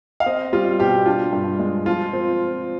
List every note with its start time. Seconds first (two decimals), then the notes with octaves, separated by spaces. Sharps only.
0.20 F5
0.26 C4 D#5
0.53 G3 F4
0.80 B2 G4
1.06 D4 F4
1.33 G2
1.59 G#3
1.86 F3 F4
2.13 C4